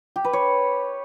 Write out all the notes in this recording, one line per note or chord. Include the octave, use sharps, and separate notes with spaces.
G4
B4
C#5